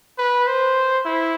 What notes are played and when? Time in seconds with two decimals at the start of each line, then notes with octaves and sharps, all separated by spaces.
0.18 B4
0.47 C5
1.05 E4